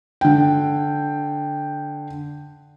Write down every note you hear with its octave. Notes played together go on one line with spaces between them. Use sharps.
D3 G5